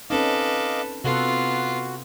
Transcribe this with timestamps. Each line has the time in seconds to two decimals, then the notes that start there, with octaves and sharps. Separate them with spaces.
0.10 C4 C#4 D#4 A4 B4 D#5 F5 D6
1.04 C3 B3 F4 F#4 A4 F#5